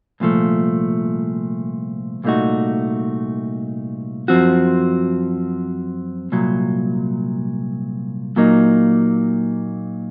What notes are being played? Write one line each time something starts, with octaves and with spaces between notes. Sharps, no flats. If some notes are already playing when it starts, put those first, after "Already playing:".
C2 A#2 F3 A3
C2 A#2 A3 D#4 F#4
F#2 F3 C4 F#4
C2 A#2 F#3
A#2 F#3 A#3 D#4